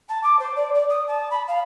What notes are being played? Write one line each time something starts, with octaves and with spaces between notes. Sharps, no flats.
A5
D6
C5
D5
D5
D#6
A5
B5
F5